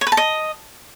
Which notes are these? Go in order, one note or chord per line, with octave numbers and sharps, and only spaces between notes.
C#5
B4
A5
D#5